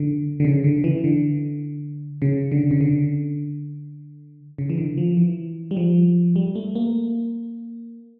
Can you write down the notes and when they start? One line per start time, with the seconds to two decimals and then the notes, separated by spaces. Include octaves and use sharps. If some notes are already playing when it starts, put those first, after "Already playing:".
Already playing: D3
0.40 D3
0.45 C#3
0.64 D3
0.84 E3
1.04 D3
2.22 C#3
2.52 D3
2.71 C#3
2.81 D3
4.58 C#3
4.69 E3
4.78 D3
4.97 F3
5.17 E3
5.71 G3
5.77 F3
6.36 G3
6.55 A3
6.75 A#3